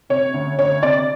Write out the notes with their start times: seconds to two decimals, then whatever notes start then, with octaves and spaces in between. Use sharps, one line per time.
0.09 C3 C#5
0.34 D2
0.58 D2 C#5
0.83 C3 D5